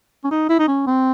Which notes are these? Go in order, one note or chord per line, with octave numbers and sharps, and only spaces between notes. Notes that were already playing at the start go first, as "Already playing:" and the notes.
C#4
D#4
E4
D#4
C#4
C4